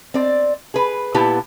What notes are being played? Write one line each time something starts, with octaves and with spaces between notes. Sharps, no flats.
C4 D5
G#4 B4
A#2 B3 E4 G4 B4 A5